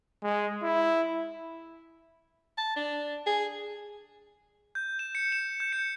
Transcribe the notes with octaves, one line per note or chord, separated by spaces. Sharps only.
G#3
E4
A5
D4
G#4
G6
E7
C#7
E7
G6
C#7